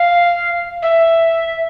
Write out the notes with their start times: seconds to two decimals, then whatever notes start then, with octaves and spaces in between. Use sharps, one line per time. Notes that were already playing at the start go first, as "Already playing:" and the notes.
Already playing: F5
0.82 E5